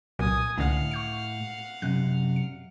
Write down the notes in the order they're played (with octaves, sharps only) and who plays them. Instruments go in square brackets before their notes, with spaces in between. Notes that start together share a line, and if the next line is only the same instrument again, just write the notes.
[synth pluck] C2 A#2 F#3 [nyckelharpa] G#5 D#6
[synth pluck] C#2 D3 F6 [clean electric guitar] A2 [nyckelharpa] F5 F#5
[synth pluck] C#6 G6 C#7
[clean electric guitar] F#2 C3 [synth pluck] F#6
[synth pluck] C#7